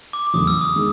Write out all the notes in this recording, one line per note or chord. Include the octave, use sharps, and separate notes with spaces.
D6
D6
E2 C#3 F#3 A3 D#6
E6
D#6
D#3 G#3